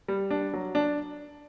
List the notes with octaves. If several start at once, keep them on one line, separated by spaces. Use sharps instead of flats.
G3
D4
F#3
D4